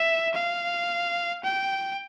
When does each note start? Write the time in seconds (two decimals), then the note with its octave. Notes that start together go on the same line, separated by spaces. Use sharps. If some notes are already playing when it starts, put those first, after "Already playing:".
Already playing: E5
0.34 F5
1.44 G5